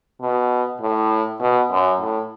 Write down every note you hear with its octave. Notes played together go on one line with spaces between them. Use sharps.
B2
A2
B2
F#2
A2